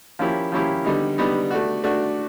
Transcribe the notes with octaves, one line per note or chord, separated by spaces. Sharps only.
F3 A#3 C#4 E4 G4
F3 A#3 C#4 E4 G4
D3 G3 B3 D#4
D3 G3 B3 D#4
A3 D4 F#4
A3 D4 F#4